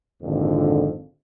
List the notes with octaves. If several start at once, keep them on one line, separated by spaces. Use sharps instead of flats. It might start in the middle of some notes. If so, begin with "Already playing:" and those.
G#1 F2 A#2 D3